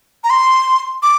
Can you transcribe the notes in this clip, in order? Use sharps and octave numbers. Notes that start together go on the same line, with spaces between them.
A#5
C6
D6